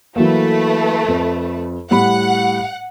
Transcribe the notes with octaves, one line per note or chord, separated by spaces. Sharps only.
E3 F#3 A3 A#3 B4
F2
A2 G3 F#5 B5